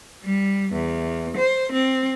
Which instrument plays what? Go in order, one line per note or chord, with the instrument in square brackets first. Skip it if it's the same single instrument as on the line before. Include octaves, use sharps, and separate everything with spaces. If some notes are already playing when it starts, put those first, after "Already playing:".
[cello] G3
E2
C5
C4